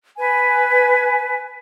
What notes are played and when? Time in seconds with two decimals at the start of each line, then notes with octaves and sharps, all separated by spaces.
0.18 B4 G#5